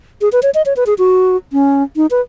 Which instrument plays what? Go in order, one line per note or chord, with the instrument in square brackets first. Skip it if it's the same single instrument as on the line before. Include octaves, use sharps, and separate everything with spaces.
[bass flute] G#4
B4
C#5
D#5
C#5
B4
G#4
F#4
C#4
D#4
B4